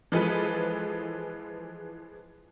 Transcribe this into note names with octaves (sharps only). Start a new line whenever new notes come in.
E3 F3 G#3 G#4 A4 B4